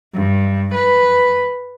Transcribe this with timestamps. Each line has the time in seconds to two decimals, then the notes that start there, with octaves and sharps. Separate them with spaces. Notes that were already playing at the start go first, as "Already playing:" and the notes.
0.14 G2
0.74 B4